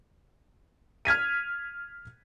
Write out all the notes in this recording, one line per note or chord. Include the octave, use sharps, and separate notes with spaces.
F6 G#6 B6 D#7